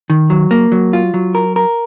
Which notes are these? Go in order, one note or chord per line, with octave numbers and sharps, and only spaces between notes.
D#3
F#3
A#3
F#3
F4
F#3
A#4
A#4